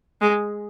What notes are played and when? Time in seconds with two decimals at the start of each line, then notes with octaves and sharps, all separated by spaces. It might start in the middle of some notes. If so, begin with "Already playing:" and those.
0.21 G#3